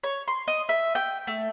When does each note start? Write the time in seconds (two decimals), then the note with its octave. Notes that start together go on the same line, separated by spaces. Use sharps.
0.04 C#5
0.28 C6
0.48 D#5
0.69 E5
0.95 G5
1.27 A3